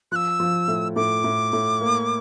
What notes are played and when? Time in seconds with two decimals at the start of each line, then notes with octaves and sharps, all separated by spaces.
0.12 F3 F#6
0.16 E6
0.40 F3
0.68 A2
0.96 A2 D6
1.24 A2
1.53 A2
1.81 A#3